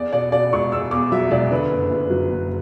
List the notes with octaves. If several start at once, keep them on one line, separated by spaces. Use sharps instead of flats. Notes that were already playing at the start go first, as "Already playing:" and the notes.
Already playing: E2 D5
B2 D5
B2 D5
E1 C#6
E2 E6
E2 D6
F#3 E5
E1 D5
D3 B4
F#1
F#1
F#3
F#1